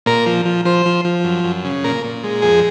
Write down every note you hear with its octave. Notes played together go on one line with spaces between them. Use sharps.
A#2 A#4
F3
F3
F3 C5
F3
F3
F#2
F#2
C#3
A#2 A#4
A#2
G#3
F2 G#4